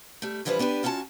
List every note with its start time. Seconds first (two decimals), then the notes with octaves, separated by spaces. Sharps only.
0.22 G3 A3
0.45 G#2 E3 F3 G3 D4 B4
0.59 B3 D4 G4 B4
0.83 D#2 C#4 F4 F#4 A5